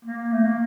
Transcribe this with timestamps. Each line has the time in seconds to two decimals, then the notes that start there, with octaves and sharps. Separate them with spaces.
0.04 A#3
0.32 A3
0.43 A#3